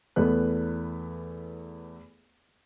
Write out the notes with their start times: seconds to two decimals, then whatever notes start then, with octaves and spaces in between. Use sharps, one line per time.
0.16 E2 E3 A3 B3 F#6